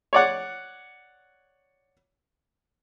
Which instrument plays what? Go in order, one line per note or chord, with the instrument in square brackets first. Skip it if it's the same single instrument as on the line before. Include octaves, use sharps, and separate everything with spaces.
[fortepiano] C#5 D5 F#5